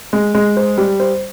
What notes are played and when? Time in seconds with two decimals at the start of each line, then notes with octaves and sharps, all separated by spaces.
0.13 G#3
0.35 G#3
0.57 C5
0.78 G3
1.00 C5